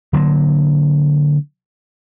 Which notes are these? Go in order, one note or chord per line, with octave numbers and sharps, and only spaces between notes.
D3 F#3 G3 A#3